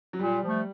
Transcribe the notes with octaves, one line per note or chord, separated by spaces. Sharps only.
F#3
A#2 G3
F3 A3